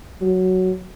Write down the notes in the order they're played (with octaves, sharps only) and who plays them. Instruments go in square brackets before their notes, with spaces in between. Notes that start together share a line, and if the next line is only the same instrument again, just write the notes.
[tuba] F#3